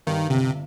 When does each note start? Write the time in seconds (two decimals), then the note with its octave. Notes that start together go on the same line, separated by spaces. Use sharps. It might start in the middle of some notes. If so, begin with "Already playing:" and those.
0.07 G2 D#3
0.30 G1 C3